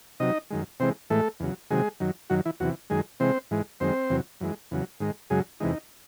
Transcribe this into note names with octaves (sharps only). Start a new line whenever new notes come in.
C3 F#3 D#4 D#5
F#2 D#3 G#3
C3 E3 G#3 C4 C5
A2 E3 G#3 A3 A4
E2 C#3 F#3
C3 D#3 F#3 G#3 G#4
F#2 D#3 F#3
F#2 D#3 F#3 F#4
E3 E4
E2 C3 E3 F#3 F#4
F#2 D#3 G#3 G#4
C3 E3 G#3 C4 C5
G#2 E3 G#3
F#2 D#3 G#3 C4 C5
E2 C3 F#3
F#2 E3 G#3
E2 C#3 F#3
G#2 D#3 G#3
F#2 C#3 F#3 G#3 G#4
E2 C3 E3 G#3 D#4